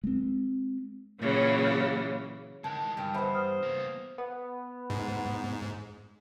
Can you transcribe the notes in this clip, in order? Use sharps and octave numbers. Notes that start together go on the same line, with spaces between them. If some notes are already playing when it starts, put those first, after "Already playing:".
G#3 C4
A#2 C#3 E3 F#3
D#3 E3 G#3 A5
G2 D#3 G3 G#4 G5
E3 B3 C5 E5 B5
D#6 F6
A#3 E4
B3
G#2